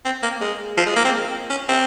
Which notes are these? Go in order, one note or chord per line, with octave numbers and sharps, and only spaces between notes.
C4
A#3
G#3
F3
G#3
A#3
C4
C#4
C4